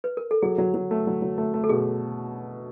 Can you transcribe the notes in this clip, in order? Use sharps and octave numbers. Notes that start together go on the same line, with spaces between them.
B4
A#4
A4
F#3 G#4
F#3
F#3
A3
F#3
F#3
A3
A3
A4
B2 G#4